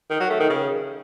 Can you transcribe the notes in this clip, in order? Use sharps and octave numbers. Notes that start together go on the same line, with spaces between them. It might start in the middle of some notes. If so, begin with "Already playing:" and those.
D#3
F#3
A3
D#3
C#3